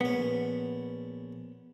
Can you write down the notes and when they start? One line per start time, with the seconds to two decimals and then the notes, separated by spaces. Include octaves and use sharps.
0.01 A#1 B3 C#4